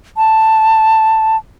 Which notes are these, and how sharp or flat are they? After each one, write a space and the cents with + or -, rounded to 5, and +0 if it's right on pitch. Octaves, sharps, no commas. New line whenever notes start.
A5 +5